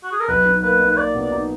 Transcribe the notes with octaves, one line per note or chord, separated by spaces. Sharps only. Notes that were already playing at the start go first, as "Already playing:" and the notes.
F#4
G#4
A#4
B1 B4
D#4
A#3 B4
D#4
B4
A#3 D5
B2
D5
D#4